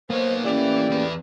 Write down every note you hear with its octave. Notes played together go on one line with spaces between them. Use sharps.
A#3 B3 C5 C#5
A2 C#4 E4 G4 B4 D5
E2 B4